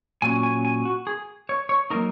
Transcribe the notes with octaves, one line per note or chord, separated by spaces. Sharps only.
A#2 F#3 C#4 G#5
G#5
G#5
F#4
G#4
C#5
C#5
F#3 A#3 D#4 A#4